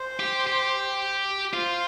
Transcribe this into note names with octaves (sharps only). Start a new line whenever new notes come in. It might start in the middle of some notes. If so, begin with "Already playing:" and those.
Already playing: C5
G4
G4
F4 C5